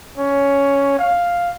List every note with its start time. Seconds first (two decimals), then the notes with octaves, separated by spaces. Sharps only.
0.17 C#4
0.99 F5